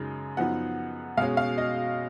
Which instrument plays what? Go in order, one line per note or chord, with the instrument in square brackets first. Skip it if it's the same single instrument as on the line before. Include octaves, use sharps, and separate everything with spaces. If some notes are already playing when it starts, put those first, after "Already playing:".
Already playing: [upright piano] F#2 C#3 G#3 D#4
F#2 F3 B3 D#4 F#5
B2 G#3 C#4 F5
F5
D#5